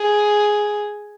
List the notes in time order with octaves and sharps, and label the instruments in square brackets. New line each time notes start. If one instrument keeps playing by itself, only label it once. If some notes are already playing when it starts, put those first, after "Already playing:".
Already playing: [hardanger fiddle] G#4